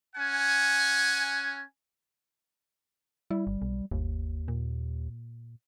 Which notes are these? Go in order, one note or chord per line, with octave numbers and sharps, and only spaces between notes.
C#4 F#5 G#5
G3 E4
G1
B1
G1 D#2
A#2